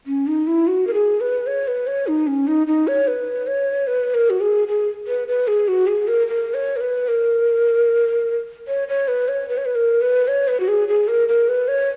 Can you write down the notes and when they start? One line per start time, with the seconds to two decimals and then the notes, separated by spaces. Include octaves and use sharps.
0.07 C#4
0.27 D#4
0.47 E4
0.67 F#4
0.87 A#4
0.94 G#4
1.21 B4
1.47 C#5
1.68 B4
1.87 C#5
2.07 D#4
2.27 C#4
2.47 D#4
2.67 D#4
2.88 C#5
3.08 B4
3.47 C#5
3.87 B4
4.14 A#4
4.30 F#4
4.41 G#4
4.68 G#4
5.07 B4
5.28 B4
5.48 G#4
5.68 F#4
5.87 G#4
6.08 A#4
6.28 A#4
6.54 C#5
6.76 A#4
6.81 B4
7.08 A#4
8.68 C#5
8.88 C#5
9.08 B4
9.28 C#5
9.49 B4
9.58 C#5
9.66 B4
9.75 A#4
10.01 B4
10.28 C#5
10.48 B4
10.60 F#4
10.68 G#4
10.88 G#4
11.08 A#4
11.28 A#4
11.48 B4
11.68 C#5